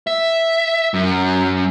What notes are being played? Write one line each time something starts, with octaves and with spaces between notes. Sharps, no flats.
E5
F#2